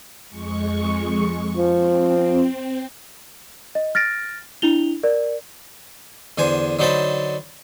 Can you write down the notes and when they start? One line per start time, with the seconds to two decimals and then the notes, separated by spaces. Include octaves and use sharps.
0.28 F2 G#3 C#6
1.57 F3 C4
3.75 D#5
3.95 F6 A6 A#6 D7
4.62 D4 E4 F7 G7
5.03 A#4 D5
6.38 E2 D3 C5 G#5
6.79 D3 F#3 D#4 C5 A5 B5